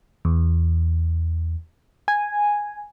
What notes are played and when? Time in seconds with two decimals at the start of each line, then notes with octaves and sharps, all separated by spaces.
0.25 E2
2.08 G#5